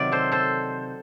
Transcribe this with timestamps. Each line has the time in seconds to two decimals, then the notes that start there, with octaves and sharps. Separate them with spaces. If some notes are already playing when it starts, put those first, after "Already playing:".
Already playing: C3 D#3 F#3 D5
0.12 A4 C5
0.32 A4 C5